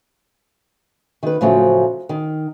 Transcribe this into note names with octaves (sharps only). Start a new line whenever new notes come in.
D#3 B4
A2 C#3 F3 F#3 C4
D#3